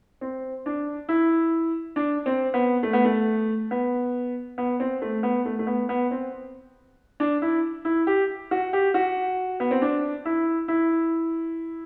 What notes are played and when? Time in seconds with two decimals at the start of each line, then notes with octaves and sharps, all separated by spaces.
0.21 C4
0.66 D4
1.09 E4
1.96 D4
2.26 C4
2.54 B3
2.83 A3
2.93 B3
3.05 A3
3.71 B3
4.58 B3
4.80 C4
5.02 A3
5.23 B3
5.46 A3
5.59 A3
5.67 B3
5.89 B3
6.11 C4
7.20 D4
7.42 E4
7.85 E4
8.07 G4
8.51 F#4
8.73 G4
8.94 F#4
9.60 B3
9.71 C4
9.82 D4
10.25 E4
10.68 E4